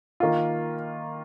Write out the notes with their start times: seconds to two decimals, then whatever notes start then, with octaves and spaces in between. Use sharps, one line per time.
0.20 D#3 A#3 F4